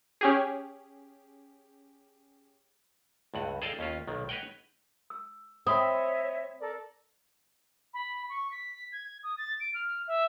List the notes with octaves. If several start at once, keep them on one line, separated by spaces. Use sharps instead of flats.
C#4 G4 G#4
C#2 G2 F#5
G#4 A4 D5 D#5 F5 G5
D#2 C#4 F4
B1 D#3
B4 C#5 D#5 F#5 G5
E6
C4 C#5 D#5 E5 B5 D#6
A4 A#4 D5
B5
C#6
B6
G#6
D#6
A6
D7
F6
E5